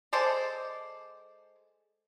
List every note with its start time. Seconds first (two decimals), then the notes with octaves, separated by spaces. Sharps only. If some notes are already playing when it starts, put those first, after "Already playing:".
0.13 G#3 A4 C5 D5